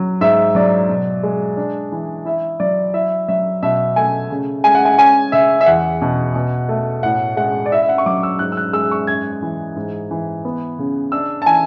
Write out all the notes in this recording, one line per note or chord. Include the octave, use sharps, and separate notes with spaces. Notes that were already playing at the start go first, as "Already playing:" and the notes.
Already playing: F#3
G#2 E5
F#3 D5
B2
G#3
D4
E3
E4 E5
F#3 D5
E4 E5
F#3 E5
B2 E5
A3 G#5
C#3
G#3 G#5
F#5
G#5
C#4 G#5
C#3 E5
E5
E2 F#5
B2
B2
A3
A2 F#5
G#3 F#5
D5
E4 E5
E5
F#5
C#6
F#3 D6
E6
G#2 F#6
E6
F#6
G#3 E6
C#6
F#2 G#6
E3
G#2
E3
B3
C#3
D4 E6
A5
E3 G#5